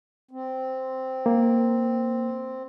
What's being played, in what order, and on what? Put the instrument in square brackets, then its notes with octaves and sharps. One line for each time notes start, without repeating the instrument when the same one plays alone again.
[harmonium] C4
[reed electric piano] A#3